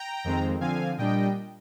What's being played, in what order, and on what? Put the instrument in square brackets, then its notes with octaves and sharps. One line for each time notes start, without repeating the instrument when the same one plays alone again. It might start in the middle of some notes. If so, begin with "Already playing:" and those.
Already playing: [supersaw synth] G5 A#5
F2 D#3 G#3 C4
D3 F3 C4 F5 G#5
A#2 G3 D4 D#5 G5